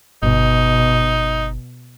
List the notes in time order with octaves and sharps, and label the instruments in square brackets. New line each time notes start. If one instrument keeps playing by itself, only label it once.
[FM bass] G1 [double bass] B2 [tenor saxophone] D#4